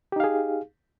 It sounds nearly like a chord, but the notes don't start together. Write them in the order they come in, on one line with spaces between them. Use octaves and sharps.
G4 D#4 F5 G#4